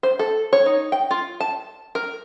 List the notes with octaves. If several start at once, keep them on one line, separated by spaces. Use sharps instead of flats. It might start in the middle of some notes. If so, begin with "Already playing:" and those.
C5
A4
C#5
D#4
G5
F4
A5
A#4